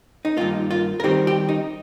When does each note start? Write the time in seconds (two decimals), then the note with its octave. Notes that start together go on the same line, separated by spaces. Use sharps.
0.25 D#4
0.37 G2 D#3 A#3 F4
0.71 F4
1.00 A#4
1.04 D#3 G3 C4 D#4 G4
1.27 G4
1.49 D#4